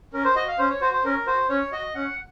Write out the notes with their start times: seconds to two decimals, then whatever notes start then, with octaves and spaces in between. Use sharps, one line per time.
0.13 C#4 A#4
0.25 C5
0.36 F#4 D#5
0.48 F5
0.59 C#4 C5
0.70 C#5
0.81 F#4 C5
0.93 C5
1.04 C#4 A#4
1.27 F#4 C5
1.49 C#4 C#5
1.72 F#4 D#5
1.95 C#4 F#5